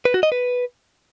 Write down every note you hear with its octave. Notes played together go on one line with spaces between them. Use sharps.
B4
F#4
D#5
B4